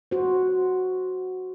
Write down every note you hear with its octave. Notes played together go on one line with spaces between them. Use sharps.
F#4 C5